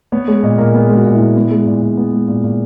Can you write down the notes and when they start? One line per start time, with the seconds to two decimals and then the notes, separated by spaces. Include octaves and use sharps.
0.12 B3 C#5
0.28 G#3 C#5
0.43 A#2 D#5
0.58 A#2 A#4
0.74 B3 G#4
0.89 G#3
0.95 F#4
1.05 A#2
1.15 E4
1.20 A#2
1.36 B3
1.51 G#3
1.66 A#2
1.82 A#2
1.97 B3
2.13 G#3
2.28 A#2
2.44 A#2